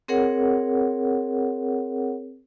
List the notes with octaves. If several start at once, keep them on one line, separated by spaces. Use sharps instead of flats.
C4 G#4 A#4 C#5 F#5